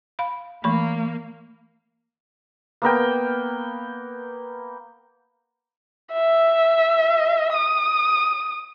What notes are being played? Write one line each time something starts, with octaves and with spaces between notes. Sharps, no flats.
F5 B5
E3 A3 A#3 B5
A#3 B3 A#4 G5
E5
D#6